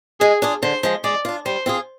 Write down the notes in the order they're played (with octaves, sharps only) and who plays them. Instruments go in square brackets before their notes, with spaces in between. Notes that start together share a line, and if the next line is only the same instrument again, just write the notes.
[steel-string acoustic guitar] G#3 [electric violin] G#4
[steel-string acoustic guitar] D4 F4 G#4
[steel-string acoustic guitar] D3 [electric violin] C5
[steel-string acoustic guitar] F3 G#3
[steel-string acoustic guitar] G#3 [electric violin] D5
[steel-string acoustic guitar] D4 F4
[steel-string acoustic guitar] G3 [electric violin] C5
[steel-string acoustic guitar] C4 F4 G#4